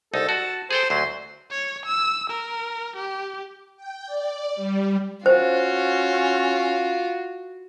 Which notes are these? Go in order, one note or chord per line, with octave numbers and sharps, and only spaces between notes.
C2 D#4 A4
F#4 A5
G#4 A4 C5 G5
D2 F#3 C6
C#5
E6
A#4
G4
G5
D5
G3
C#4 F4 F#4 C5